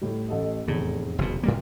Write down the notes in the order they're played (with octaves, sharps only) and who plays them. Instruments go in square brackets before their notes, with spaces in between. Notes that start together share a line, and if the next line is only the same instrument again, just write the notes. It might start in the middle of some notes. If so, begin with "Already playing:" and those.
[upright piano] A2 G3
A1 A4 D#5
[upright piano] F1 E2 [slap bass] A2
[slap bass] F#1 B2
A2 G3 A#3